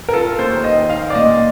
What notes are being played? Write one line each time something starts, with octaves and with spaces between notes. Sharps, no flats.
A#4
F4 A4
D#2 C5
D#3 D#5
D#4 F5
D5
A#2 D#5